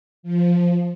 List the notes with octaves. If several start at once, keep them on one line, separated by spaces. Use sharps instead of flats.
F3